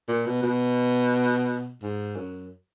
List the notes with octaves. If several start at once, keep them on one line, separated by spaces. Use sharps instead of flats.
A#2
B2
B2
G#2
F#2